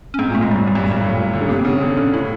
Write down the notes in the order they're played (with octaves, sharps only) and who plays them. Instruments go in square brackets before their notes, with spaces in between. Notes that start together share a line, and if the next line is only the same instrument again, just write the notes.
[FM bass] C#4
[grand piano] G#2 [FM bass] C4
[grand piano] A#2 [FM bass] A3
[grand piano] G#2 [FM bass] G#3
[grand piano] F#2 [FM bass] G3
[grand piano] F#2 [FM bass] G3
[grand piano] G2
[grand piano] F#2 [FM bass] G3
[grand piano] G2
A2
A#2
D3
C#3
[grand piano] C3 [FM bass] A#3
[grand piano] C3 [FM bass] C4
[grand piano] C#3 [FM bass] B3
[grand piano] D3 [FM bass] C4
[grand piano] D3 [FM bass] C#4
[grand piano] A2 [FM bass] E4